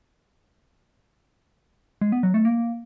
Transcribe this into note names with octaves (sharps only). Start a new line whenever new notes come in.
G#3
B3
F#3
A3
A#3